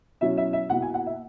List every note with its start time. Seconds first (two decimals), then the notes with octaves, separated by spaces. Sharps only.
0.21 B2 F#3 C#4 E4 E5
0.37 E5
0.53 E5
0.70 B2 A#3 E4 F#5
0.82 G#5
0.94 F#5
1.06 E5